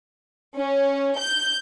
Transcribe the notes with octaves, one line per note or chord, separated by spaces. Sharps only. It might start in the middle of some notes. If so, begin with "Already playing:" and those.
C#4
G6